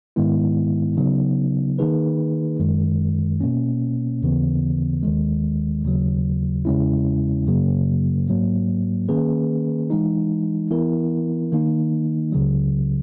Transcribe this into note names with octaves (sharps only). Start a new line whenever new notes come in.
G#2 D#3 G#3 B3 E4
C#3 F#3 B3 D#4
D#3 A#3 D#4 G#4 B4
F#2 D#3 G#3
B2 A#3 C#4
D#2 C#3 E3 B3
D#2 D#3 G#3
D#2 C#3 F#3
E2 C#3 G#3 C#4 E4
F#2 C#3 F#3 A#3
G#2 F#3 A#3
D#3 A#3 C#4 G#4 B4
E3 G#3 D#4
E3 B3 E4 A#4
D#3 A#3 D#4
C#2 C#3 F#3